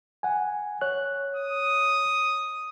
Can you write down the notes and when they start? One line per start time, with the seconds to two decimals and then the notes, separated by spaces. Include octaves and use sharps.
0.23 F#5 G#5
0.81 C#5 F#6
1.36 D#6